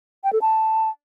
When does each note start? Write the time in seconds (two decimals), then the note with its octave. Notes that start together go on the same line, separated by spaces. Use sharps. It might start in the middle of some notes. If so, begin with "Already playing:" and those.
0.24 G5
0.33 A4
0.42 A5